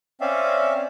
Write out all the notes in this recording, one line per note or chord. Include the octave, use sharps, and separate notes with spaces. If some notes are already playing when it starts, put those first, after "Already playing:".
C4 C#4 D5 E5 F5